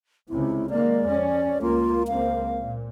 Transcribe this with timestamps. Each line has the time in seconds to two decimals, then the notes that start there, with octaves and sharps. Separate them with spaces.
0.29 C#2 C3 E4
0.70 D#3 G#3 A#3 D5
1.04 F2 C#4
1.62 C#2 A#3 F4
2.08 C#2 A#3 C4 F5
2.60 A#2